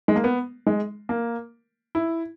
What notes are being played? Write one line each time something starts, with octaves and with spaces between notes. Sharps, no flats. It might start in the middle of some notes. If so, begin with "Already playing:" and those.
G#3
A#3
B3
G#3
A#3
E4